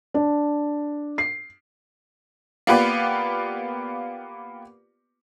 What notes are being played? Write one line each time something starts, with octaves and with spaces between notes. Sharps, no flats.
D4
C7
A#3 B3 F4 G4 B4 D5